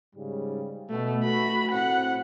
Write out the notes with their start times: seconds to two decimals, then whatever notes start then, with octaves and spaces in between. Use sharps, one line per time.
0.15 G#2 C#3 G3
0.90 B2 A3
1.24 A3 F#4 B5
1.72 A2 C4 F#5